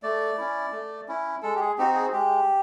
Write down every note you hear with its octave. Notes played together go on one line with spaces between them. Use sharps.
A3 D5
C#4 E4
A3
C#4 E4
G#3 A4
G4
G#4
C4 D#4 F#4 G4
G#4
G#3 G4